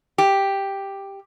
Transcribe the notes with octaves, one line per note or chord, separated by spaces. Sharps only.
G4